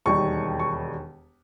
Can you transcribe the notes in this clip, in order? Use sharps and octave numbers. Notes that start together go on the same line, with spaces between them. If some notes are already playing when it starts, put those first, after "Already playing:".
E1 D#2 D#3 G3 C#6
C#6